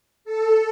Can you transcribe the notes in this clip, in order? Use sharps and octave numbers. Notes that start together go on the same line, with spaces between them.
A4